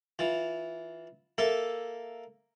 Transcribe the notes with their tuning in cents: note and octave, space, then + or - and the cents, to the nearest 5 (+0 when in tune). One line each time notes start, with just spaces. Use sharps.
E3 -10 F4 +5
A#3 +0 A4 +0 E5 +0